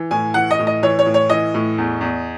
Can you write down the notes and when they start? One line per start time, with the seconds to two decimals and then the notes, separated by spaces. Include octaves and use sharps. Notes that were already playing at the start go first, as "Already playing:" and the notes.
Already playing: E3
0.11 A2 G#5
0.34 E3 F#5
0.51 D#5
0.59 A2
0.67 D#5
0.83 E3 C#5
0.99 C#5
1.06 A2
1.14 C#5
1.30 E3 D#5
1.54 A2
1.78 E2
2.01 E2